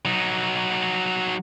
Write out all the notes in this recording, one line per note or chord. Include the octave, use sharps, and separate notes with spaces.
F#3 D#4